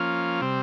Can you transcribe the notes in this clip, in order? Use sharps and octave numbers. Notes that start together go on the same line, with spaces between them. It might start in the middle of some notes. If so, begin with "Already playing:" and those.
Already playing: F3 A#3 C#4 F4
C3 G3 C4